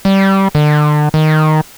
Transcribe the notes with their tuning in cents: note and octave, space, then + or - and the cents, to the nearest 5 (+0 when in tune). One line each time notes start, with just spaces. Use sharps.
G3 -15
D3 +35
D#3 +0